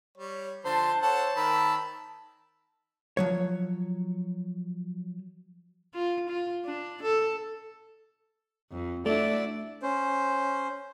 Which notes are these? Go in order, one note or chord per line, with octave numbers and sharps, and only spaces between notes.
G3 C#5
D3 F3 C5 A5 C6
A4 C#5 F#5 A5
D#3 A#4 B5 E6
F3 F#3 C#5
F4
F4
D4
A4
F2
A3 D4 E4 F#4 D5
C#4 C5